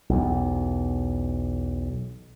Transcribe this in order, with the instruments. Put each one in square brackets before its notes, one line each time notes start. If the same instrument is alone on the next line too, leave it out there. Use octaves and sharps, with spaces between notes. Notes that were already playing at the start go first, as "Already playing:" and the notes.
[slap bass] B1 E2